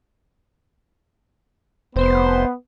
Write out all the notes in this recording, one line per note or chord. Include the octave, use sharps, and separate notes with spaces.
F1 B3 C5